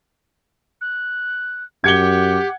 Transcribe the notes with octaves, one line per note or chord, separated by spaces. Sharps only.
F#6
F#2 G4 F#5 G#6 C#7 G7